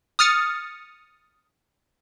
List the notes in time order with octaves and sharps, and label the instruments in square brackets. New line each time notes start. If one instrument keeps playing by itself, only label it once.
[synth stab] D#6 F6 A6 C#7